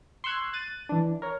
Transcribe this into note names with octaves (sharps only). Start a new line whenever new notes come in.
C6 C#6 E6 F#6 G#6
F#6 A6 D#7
E3 D4
A#4 C#5